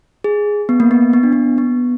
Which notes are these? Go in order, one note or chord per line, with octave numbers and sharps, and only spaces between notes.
G#4
B3
A#3
B3
B3
D4
B3
B3